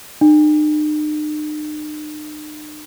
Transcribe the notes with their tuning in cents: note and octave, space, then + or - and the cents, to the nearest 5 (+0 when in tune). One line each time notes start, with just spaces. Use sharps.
D#4 -45